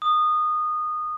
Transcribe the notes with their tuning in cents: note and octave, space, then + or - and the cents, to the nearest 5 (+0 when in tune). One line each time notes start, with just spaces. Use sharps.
D#6 -20